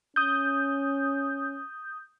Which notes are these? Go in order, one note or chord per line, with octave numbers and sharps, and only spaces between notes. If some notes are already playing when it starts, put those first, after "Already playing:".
C#4 D#6 G6